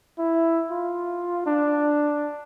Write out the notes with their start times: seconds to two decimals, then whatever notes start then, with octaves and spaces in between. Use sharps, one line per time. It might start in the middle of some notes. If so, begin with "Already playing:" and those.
0.18 E4
0.71 F4
1.46 D4